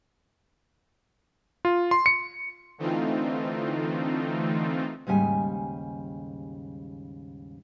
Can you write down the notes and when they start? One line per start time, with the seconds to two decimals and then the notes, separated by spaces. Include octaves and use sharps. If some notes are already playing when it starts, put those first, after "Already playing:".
1.65 F4
1.91 C6
2.06 C#7
2.78 D3 E3 A3 C4 D#4 F4
5.07 D#2 G#2 C#3 G3 G#5